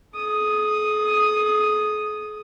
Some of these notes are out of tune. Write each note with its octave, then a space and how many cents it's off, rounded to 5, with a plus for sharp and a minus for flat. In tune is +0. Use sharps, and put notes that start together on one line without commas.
G#4 +45 D#6 +0